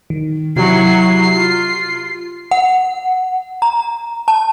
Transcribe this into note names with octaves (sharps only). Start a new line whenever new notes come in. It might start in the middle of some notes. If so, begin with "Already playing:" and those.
D#3
C3 F#3 E4 F#4 G4 C7
F4
F#5
A#5
A5